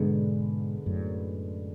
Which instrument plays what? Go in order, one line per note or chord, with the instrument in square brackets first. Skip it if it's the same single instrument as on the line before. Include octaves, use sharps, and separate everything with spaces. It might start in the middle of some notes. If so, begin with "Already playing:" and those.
Already playing: [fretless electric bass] G#2 B2 [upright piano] D3 G#3 B3 D4
[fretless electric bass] F#2 A2